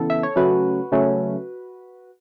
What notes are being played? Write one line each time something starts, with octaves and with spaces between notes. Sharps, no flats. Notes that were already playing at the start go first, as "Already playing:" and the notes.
Already playing: C#3 E3 B3 A4
E5
C#5
C#3 F#3 A3 C#4 F#4 B4
C#3 F#3 A3 C#4